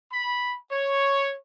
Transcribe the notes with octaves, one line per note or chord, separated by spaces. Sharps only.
B5
C#5